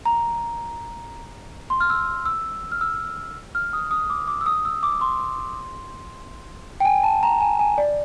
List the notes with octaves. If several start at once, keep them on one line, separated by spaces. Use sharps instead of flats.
A#5
C6
F6
E6
E6
F6
E6
F6
D#6
D#6
D6
D6
E6
D#6
E6
D6
C6
G5
G#5
A5
A#5
G#5
G#5
D5